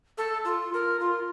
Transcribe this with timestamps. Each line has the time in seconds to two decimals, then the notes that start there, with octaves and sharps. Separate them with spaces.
0.18 A4
0.45 F4
0.74 A#4
1.00 F4